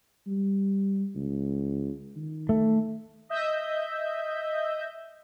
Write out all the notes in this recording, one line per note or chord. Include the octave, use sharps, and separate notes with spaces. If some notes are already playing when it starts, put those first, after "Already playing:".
G3
C#2
D#3
A3
D#5 E5 G6